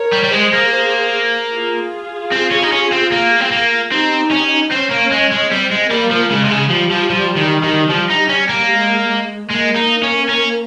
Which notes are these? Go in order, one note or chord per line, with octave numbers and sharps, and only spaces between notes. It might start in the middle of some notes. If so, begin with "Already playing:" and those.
Already playing: A#4 C#5
G3
G3
G#3 G#4 C5
A#3
G#4 C5
F4 G#4
C4
C#4
D#4
C#4
C4
A#3
C4
A#3
C4 D#4 G4
C#4
C4 C#4
A#3
G#3
G#3
G3 C4
G#3
G3 A#3
F3
C#3 G#3
C3
C#3
F3 G3
F3
F3
D#3
D#3
F3 G3
D#4
C#4
A#3
G#3
G#3
G#3 A#3
D#4
C#4
C#4